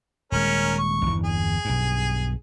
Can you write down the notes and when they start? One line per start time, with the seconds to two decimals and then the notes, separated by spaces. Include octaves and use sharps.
0.32 D#1 G#3 C#4 A#4
0.78 C#6
1.06 G1 E2 E3
1.24 G#4
1.65 B1 G2